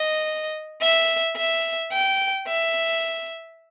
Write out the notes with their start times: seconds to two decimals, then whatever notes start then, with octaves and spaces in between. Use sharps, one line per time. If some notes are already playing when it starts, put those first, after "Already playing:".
Already playing: D#5
0.82 E5
1.37 E5
1.92 G5
2.48 E5